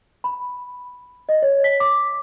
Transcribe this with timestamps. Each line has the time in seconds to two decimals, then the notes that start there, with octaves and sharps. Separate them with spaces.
0.24 B5
1.29 D#5
1.42 C#5
1.64 B6
1.80 D6